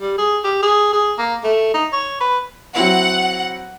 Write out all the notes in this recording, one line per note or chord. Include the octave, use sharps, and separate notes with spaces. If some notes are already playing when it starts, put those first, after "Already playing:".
G3
G#4
G4
G#4
G#4
A#3
A3
D#4
C#5
B4
F#3 C4 E4 F#5